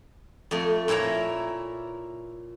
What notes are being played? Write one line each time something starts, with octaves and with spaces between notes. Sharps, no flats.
F2 A3
A#2 E4 C#5 E5 A#5